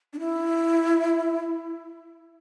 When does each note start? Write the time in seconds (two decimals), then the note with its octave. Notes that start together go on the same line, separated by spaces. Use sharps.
0.13 D4
0.19 E4